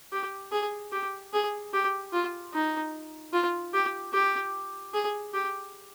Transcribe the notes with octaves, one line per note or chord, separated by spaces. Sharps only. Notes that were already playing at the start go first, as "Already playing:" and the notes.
G4
G#4
G4
G#4
G4
F4
D#4
F4
G4
G4
G#4
G4